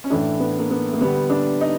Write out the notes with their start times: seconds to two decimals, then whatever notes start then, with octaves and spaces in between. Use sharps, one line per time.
0.04 C#4
0.10 A2 E3 A3 D4
0.40 B3
0.59 A#3
0.71 B3
0.93 A#3
1.00 D3 G3 B3
1.30 D4
1.61 D#4